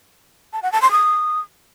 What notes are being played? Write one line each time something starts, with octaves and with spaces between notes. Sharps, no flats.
A5
F#5
A5
C6
D#6